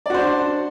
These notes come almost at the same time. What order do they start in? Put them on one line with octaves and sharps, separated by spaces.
D5 F#4 C5 D4